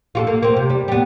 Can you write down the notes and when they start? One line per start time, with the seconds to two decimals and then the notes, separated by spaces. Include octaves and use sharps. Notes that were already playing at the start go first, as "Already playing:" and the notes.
0.15 F4 F#4 A4
0.27 A#3
0.42 A#3 C4
0.56 C3
0.70 G3
0.88 G3 B3